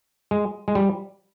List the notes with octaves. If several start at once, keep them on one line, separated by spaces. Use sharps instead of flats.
G#3
G#3
G3